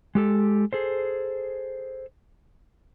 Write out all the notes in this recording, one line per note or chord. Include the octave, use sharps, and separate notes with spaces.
G#3 G4 A4
G#4 A4 C5